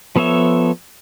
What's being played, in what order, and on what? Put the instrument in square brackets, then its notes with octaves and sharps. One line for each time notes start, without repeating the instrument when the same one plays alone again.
[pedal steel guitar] F3 B3 A4 C#5 E5